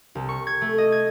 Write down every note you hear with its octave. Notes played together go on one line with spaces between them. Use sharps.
C2
C#6
G#6
A3
D#5
G#6